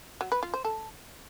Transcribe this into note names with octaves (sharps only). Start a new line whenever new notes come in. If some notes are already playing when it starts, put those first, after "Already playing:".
F#3
B4
F4
C5
A4